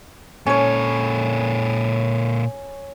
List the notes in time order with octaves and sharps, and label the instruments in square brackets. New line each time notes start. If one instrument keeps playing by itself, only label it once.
[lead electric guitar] A#2 A4 [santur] C#4 C#5